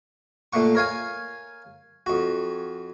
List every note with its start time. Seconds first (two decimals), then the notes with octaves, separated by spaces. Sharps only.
0.53 A#2 A3 A#3 F#5 C#6
0.75 A#4 C#5 F5 G#5
2.06 F2 F#4